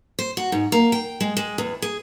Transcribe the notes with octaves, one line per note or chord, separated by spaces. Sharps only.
C5
F#4
G#2
A#3
G5
G#3
G#3
E2
G#4